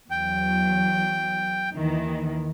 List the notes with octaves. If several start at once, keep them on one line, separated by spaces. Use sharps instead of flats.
E2 F#3 G5
D#2 D#3 E3